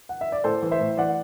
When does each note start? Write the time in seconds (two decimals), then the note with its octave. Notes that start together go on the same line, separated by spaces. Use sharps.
0.09 F#5
0.21 E5
0.32 D5
0.44 A2 A4 C5
0.62 E3
0.71 C5 E5
0.80 A2
0.97 E3 D5 F#5